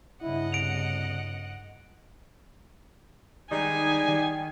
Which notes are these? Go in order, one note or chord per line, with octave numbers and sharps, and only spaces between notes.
G2 C#3 E4 D#5 F#5
C2 D7 F7
D#3 G3 G#3 D#4 G#5
D#3